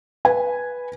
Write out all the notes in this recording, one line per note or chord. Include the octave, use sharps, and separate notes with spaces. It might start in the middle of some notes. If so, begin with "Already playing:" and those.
B4 G#5